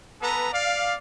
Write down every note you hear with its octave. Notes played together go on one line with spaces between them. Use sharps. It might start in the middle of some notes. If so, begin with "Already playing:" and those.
B3 A4 B4 A#5
D5 F5